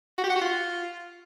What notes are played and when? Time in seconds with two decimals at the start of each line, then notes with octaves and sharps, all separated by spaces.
0.18 F#4
0.24 G4
0.30 F#5
0.36 F#4
0.41 F4